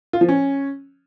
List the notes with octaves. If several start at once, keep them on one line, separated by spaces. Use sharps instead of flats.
F4
F3
C#4